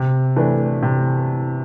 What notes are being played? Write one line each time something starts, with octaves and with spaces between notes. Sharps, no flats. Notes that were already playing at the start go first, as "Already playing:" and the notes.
Already playing: C3
E3 A3 D4
C3